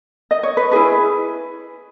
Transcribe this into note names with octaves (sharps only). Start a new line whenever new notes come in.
D#5
C#5
B4
E4 G#4 B4